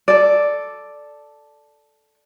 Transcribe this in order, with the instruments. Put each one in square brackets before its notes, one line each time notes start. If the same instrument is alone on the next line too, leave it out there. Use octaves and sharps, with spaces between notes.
[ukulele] A4 D5